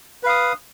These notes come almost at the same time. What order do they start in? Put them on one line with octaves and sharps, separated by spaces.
B4 F5 D#6